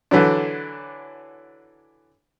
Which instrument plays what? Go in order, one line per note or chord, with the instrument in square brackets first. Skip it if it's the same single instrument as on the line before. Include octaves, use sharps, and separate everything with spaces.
[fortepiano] D3 E3 F#3 D4